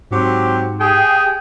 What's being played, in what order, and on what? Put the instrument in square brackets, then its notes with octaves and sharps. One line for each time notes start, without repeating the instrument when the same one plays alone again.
[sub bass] G#2 [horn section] F#3 C4 G4
[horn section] G4 G#4 [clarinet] G5